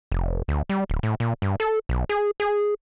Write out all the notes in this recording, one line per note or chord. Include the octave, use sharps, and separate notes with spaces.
F1
D2
G3
D1
A2
A#2
G2
A4
B1
G#4
G#4